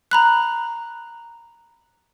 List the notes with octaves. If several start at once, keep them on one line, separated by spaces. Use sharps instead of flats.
A#5 B5 F#6